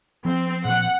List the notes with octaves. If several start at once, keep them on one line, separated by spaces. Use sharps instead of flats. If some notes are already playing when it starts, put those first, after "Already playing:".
F3 C4
A#2 F3 F#5